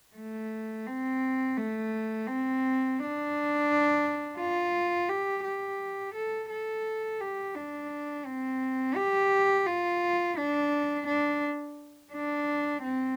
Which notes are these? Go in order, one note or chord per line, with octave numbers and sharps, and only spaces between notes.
A3
C4
A3
C4
D4
F4
G4
G4
A4
A4
G4
D4
C4
G4
F4
D4
D4
D4
C4